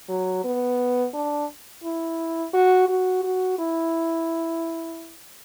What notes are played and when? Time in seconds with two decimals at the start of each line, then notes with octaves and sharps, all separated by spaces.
0.09 F#3
0.45 B3
1.14 D4
1.84 E4
2.54 F#4
2.89 F#4
3.24 F#4
3.59 E4